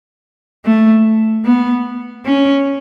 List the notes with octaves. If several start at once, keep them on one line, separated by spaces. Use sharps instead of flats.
A3
B3
C#4